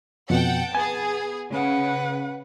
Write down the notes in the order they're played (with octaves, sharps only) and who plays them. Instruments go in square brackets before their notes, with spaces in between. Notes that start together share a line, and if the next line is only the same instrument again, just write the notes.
[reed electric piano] F2 B2 [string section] F#5 G5 [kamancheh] A5
[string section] B3 G#4 [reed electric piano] G#5
[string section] C#3 [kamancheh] B4 F#5